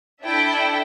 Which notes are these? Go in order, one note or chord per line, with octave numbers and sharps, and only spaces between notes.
D4 E4 A4 E5 G5